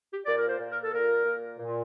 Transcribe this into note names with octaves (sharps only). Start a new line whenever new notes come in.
G4
A#2 D5
A#4
C5
A#2
A#4
A4
A#2 A#4
A#2
A#2